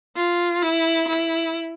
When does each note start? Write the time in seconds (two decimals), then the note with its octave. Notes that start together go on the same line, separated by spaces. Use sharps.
0.16 F4
0.62 E4
1.08 E4